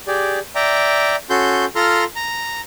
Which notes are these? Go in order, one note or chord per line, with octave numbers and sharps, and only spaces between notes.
G4 G#4 D5
D5 E5 G5 A#5
C#4 F#4 A4 C6 G6
F4 A4 A#5 C6 F6
A#5